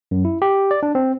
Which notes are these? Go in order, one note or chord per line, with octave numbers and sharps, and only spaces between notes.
F#2
E4
G4
D5
D4
C4